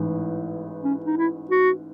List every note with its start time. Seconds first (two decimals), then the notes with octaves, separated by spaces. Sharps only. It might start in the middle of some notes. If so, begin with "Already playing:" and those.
Already playing: A1 G#2 E3
0.84 C#4
1.05 D#4
1.18 E4
1.51 F#4